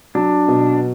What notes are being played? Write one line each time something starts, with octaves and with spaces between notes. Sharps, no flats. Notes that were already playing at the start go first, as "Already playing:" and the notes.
F#3 D4
B2